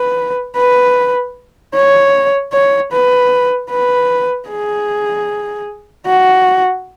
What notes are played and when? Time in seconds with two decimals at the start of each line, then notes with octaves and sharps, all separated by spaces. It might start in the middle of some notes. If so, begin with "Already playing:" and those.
Already playing: B4
0.57 B4
1.74 C#5
2.53 C#5
2.92 B4
3.71 B4
4.49 G#4
6.06 F#4